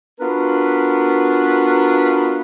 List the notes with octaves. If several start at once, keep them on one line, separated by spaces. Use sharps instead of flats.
B3 D4 F4 F#4 A#4 B4